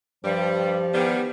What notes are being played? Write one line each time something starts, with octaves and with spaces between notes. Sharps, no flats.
G2 F3 G3
G4
D#3 E3 G3 B3